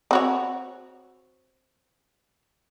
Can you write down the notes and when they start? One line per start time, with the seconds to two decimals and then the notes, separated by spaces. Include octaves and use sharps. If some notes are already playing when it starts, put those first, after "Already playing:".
0.11 C4 F#4 C#5